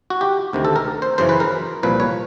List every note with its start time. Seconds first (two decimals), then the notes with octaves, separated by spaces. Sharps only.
0.10 F#4
0.21 G4
0.53 D2 C3 D#3
0.65 A4
0.76 A#4
1.02 C5
1.18 F#2 C#3 E3 C5
1.29 B4
1.40 A#4
1.83 C2 A#2 F3 B4
2.00 C#5